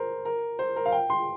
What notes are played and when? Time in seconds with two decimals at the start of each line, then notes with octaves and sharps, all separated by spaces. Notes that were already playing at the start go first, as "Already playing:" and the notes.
Already playing: A#4 C5
0.25 A#4
0.59 C5
0.76 A#4
0.86 F5
0.92 G5
1.10 C6